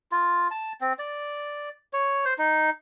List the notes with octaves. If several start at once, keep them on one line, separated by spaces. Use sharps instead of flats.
F4
A5
C4
D5
C#5
C5
D#4